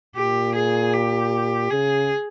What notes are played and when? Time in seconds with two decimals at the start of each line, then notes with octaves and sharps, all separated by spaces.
0.16 A#2 G4
0.56 G#4
0.93 G4
1.70 C#3 G#4